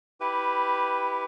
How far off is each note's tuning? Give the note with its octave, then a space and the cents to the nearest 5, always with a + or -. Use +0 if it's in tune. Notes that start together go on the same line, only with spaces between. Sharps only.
E4 -15 G4 +0 B4 +5